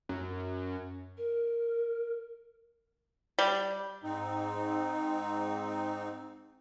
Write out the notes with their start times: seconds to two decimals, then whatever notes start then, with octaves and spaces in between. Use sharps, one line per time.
0.09 F#2
1.18 A#4
3.39 G3
4.04 G#2 C4 D#4